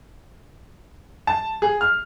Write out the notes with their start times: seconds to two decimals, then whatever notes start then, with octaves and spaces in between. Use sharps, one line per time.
1.27 A5
1.62 G#4
1.81 F6